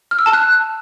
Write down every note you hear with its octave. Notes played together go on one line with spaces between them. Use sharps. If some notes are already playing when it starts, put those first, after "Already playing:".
F6
E6
A5
F#6